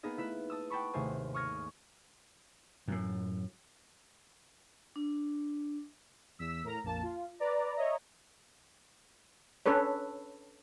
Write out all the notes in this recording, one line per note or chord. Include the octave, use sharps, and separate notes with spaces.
A#3 B3 D#4 G#4 D#5
A3 E4 B4 E5
A5 D#6 E6
F#5 G5 A5 B5 C#6
G#1 D#2 C3 A3 C5 G#5
C#6 D#6 F6 G#6 A#6 C#7
F#2 A2
D4
E2 E6 B6
A2 A#4 A#5
A#1 F2 A#3 A5
F4
B4 D5 A#5
C#5 D#5 E5 A#5
C#4 D4 A4 B4 C#5